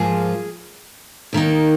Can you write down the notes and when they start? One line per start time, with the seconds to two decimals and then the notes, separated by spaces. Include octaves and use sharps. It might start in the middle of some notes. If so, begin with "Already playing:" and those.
Already playing: G#2 F3 A#3 F4 G#4
1.33 D#2 D#3 A#3 D#4